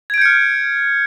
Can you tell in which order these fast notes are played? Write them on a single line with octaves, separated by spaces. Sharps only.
G#6 D7 G6 C#7 F6